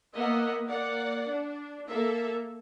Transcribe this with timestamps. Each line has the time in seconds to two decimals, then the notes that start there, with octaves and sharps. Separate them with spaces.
0.15 A#3 B3 D#5 E5 F#5
0.66 A#3 D5 F#5
1.29 D4
1.87 A#3 A4 A#4 E5